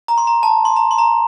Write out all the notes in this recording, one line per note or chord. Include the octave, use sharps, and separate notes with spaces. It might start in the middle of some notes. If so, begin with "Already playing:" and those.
A#5
C6
A#5
A5
C6
A#5
C6
A#5